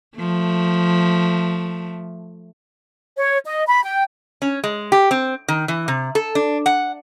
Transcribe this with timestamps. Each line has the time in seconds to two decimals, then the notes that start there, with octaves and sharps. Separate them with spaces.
0.17 F3 A3
3.17 C#5
3.45 D#5
3.67 B5
3.83 G5
4.42 C#4
4.64 G#3
4.92 G4
5.11 C4
5.48 D#3
5.68 E3
5.88 C3
6.15 A4
6.35 D4
6.66 F#5